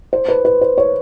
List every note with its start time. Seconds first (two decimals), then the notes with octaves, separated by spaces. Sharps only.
0.13 C5
0.28 B4
0.45 B4
0.61 C5
0.78 C#5